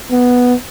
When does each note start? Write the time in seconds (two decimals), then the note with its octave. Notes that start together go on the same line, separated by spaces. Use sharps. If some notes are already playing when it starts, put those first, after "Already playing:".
0.11 B3